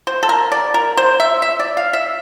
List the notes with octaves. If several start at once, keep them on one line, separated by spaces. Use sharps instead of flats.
C5
A4
A#4
D5
A#4
C5
E5
E5
D5
F5
E5